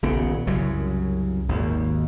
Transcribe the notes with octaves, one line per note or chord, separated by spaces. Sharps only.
D#1 A#1 C#3 B3
C2 F#2 C#3 F#3
G#1 D#2